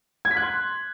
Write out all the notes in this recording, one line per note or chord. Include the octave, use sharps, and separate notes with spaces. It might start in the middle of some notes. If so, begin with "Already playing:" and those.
G#6
B6
F#6
C6